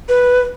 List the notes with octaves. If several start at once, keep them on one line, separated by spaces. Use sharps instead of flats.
B4